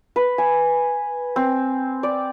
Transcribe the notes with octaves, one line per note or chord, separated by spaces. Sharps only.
B4
G#5
C4
D5